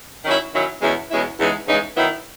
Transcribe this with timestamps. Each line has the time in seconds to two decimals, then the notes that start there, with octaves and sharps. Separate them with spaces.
0.24 D#3 F#3 C#4 E4
0.53 D#3 F#3 C#4 E4
0.81 E2 B2 G#3 C#4 E4
1.11 E2 B2 G#3 C#4 E4
1.39 E2 C#3 E3 G#3 D#4
1.68 E2 C#3 E3 G#3 D#4
1.97 D#3 F#3 B3 E4